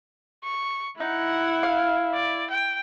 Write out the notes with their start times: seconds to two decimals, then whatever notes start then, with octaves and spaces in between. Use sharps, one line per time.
0.44 C#6
1.00 D#4 E4 F#5
1.63 F5
2.14 D5
2.50 G5